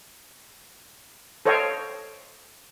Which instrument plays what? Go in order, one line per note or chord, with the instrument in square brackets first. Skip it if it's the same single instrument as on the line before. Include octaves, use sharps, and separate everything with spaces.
[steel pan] A4 C5 C#5 D#5 F5 G5